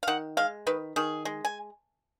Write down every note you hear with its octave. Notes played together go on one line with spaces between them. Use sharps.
F5
D#3 F#5
G#3 F5
D#3 B4
D#3 G#4
G#3
G#5